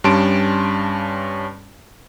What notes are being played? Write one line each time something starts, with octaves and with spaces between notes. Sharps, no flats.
G2 G3 C#4 A5 C6 D7